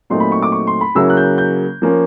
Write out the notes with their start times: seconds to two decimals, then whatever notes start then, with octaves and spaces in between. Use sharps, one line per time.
0.10 A#2 F#3 A3 C4 D#4 C6
0.20 B5
0.32 C#6
0.42 D6
0.52 C#6
0.67 C6
0.81 B5
0.95 C#3 F#3 A#3 C#4 E4 E6
1.10 F#6
1.17 G6
1.38 G6
1.82 F3 A#3 C#4